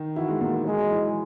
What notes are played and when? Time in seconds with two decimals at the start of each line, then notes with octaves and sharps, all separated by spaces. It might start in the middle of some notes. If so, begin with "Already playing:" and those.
Already playing: D#3 D#4
0.16 E3 E4 F#4
0.28 G#3
0.40 A#2 A#3
0.64 F#3 G#3
0.89 E3